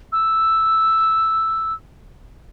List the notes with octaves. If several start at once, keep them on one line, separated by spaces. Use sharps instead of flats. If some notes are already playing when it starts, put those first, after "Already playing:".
E6